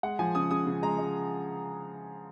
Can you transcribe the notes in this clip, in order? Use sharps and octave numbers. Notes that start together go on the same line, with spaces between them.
G#3 F#5
F3 G#5
C#3 D#6
C#3 D#6
C#3
G#3 A#5
G#3